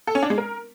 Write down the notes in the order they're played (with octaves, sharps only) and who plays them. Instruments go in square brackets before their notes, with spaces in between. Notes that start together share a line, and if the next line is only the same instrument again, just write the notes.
[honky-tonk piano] A4
C#4
D4
G#3
A#4